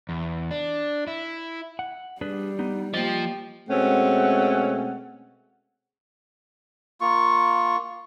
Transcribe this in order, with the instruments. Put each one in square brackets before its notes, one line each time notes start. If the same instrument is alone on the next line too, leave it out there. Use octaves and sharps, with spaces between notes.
[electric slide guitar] E2
D4
E4
F#5
[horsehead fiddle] G3 [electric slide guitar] D4 G#4 B4
[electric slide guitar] B3 D#4
[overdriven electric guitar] F3 [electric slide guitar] A#3 C5 D#5 [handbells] G4 G5
[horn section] B2 G#3 A3 C4 C#4 F#5
[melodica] A#3 F4 C#6